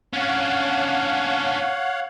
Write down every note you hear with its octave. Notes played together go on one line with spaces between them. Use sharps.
C#4 D4 C#5 F5 F#5